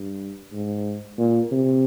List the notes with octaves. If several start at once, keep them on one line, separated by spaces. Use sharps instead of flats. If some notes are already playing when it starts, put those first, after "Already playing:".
Already playing: G2
G#2
A#2
C3